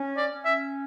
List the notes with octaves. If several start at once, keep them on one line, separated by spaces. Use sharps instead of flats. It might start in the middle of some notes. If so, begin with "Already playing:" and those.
Already playing: C#4
D5
C#4
E5